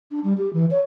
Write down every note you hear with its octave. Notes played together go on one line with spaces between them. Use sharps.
D4
G3
G4
E3
C#5